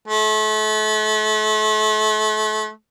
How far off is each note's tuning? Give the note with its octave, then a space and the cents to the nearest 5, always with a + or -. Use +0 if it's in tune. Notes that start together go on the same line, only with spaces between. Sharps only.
A3 -35